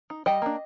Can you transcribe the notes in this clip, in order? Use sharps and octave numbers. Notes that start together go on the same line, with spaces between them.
D#4
G3 D#5 G5
A#3 D4